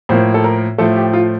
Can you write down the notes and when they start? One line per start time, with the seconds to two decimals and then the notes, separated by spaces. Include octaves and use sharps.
0.09 A2 F3 A#3 C5
0.34 A4
0.44 A#4
0.78 A2 F3 A3 A4
0.96 G4
1.13 F4